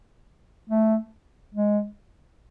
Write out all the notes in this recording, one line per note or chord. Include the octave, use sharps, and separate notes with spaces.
A3
G#3